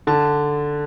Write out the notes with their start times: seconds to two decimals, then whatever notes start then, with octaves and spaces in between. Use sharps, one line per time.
0.07 D3 A5